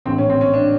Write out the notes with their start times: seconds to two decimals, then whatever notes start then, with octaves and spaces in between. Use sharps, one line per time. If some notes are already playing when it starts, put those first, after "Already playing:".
0.05 A#1 A2 E3 C4
0.18 C#4
0.30 C4
0.41 C#4
0.54 D4